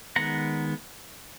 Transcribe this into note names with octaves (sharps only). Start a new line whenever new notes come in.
D#3 G#3 B3 F#5 A#5